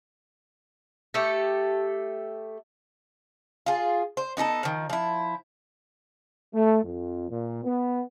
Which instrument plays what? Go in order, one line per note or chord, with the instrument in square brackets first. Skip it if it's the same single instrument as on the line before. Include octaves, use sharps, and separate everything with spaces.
[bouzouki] A3 G4 A4
F4 G#4
C5
B3 D#4 G#4 A4
D#3 F3
F3 E4
[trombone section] A3
F2
A#2
B3